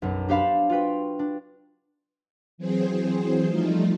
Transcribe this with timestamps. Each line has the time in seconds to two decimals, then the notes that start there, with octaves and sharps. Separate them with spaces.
0.02 B1 F#2
0.29 D4 G4 C5 F5 A5 B5
0.69 F4 F#4 B4 G5
1.19 D4
2.58 E3 F#3 C4 G#4 C5
3.47 F3 G3 A3 D#4 F4